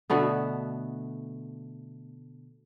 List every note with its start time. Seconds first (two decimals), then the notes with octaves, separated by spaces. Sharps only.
0.10 B2 D3 A3 B3